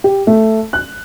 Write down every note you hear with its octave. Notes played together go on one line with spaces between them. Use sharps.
G4
A3
F#6